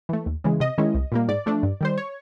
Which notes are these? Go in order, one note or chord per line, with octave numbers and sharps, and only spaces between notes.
E3 A3
D#2
C#3 E3 G#3
C3 D#5
D#3 G#3 C#4 E4
C2
A#2 G3 A#3
G#2 D5
F3 A3 D4
G2
D#3 G3 C5
C#5